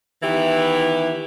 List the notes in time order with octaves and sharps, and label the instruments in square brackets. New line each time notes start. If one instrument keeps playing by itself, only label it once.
[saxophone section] D#3 E3 B3 E4 G4